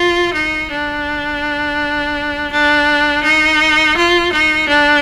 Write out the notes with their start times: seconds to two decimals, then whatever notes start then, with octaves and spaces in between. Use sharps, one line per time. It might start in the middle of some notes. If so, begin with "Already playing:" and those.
Already playing: F4
0.33 D#4
0.71 D4
2.52 D4
3.23 D#4
3.97 F4
4.32 D#4
4.69 D4